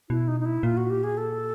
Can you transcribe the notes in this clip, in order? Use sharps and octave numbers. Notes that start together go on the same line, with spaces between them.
B2 E4
D#4
D#4
E4
A#2 F4
F#4
G4
G#4
A4